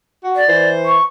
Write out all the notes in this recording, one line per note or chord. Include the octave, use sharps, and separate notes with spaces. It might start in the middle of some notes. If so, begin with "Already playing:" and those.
F#4
D5
E3 C5
C#6